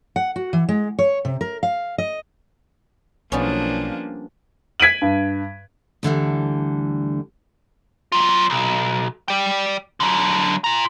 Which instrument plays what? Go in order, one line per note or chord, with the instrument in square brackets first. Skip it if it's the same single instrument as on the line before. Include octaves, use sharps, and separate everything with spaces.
[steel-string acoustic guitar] F#5
F#4
E3
G#3
C#5
C3
A#4
F5
D#5
[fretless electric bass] B1 [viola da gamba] F3 A#3 D4 [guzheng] G3 B3 C#4
[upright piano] G#6 B6 D7 D#7 F#7
G2
[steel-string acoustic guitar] D2 D3 E3 G3
[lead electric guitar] F#3 F4
B1
D5 G5
D3 F#3
F4 A#5